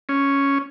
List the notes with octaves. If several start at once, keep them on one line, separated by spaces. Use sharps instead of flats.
C#4